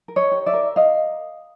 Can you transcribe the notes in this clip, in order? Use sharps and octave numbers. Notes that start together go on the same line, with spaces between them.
A#4
C#5 D#5
G4
D5 E5
A#4
A#4 D#5 F5